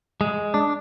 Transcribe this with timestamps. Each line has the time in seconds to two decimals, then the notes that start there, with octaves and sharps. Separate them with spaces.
0.21 G#3
0.54 D4